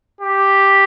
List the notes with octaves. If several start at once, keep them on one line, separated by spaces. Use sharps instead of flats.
G4